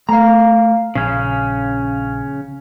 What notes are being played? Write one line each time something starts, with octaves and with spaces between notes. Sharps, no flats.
A3 F5 A#5
A#1 C#3 C#4